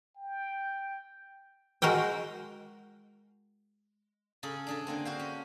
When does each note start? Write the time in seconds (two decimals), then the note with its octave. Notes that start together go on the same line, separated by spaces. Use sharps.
0.16 G5
1.82 G#3 F#4 A#4 F#5 G5
4.43 C#3 G#4 A4
4.67 D4 G#4 A4
4.87 D3 A#3 C4
5.05 F#4 C5 F5
5.19 C#4